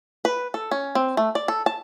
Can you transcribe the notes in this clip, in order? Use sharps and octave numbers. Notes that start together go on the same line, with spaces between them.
B4
A4
C#4
C4
A3
D5
A4
A5